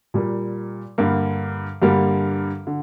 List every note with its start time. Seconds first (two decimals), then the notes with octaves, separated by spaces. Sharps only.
0.14 A#2 G3 A#3
0.98 G2 D3 G3 A#3
1.82 G2 D3 G3 A#3
2.67 D3